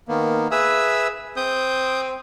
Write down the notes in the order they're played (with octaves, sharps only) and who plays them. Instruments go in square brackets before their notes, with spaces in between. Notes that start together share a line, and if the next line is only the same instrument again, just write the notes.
[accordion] D#3 A#3 B3
[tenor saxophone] G#4 [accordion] B4 E5 E6
[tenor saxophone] C4 [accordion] D#6 G6